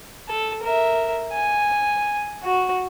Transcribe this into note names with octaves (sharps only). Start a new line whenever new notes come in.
A4
A#4 E5
G#5
F#4